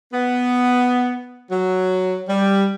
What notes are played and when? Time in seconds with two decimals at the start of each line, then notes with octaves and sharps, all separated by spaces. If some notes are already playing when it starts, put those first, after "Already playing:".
0.13 B3
1.51 F#3
2.28 G3